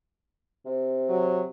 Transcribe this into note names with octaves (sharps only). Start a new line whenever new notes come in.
C3
F#3